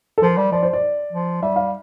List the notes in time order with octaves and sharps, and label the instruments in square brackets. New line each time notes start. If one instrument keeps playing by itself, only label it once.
[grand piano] A4
[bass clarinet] F3 [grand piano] A#4
[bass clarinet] G3
[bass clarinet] F3 [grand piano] D5
[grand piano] C5
D5
[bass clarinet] F3
[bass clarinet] G3 [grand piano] E5
[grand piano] F5